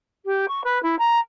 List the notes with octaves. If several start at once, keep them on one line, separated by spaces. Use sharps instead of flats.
G4
C#6
B4
E4
A#5